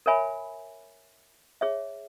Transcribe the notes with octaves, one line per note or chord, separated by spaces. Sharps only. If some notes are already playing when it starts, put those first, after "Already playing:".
A#4 C#5 E5 G#5 B5
G#4 C#5 E5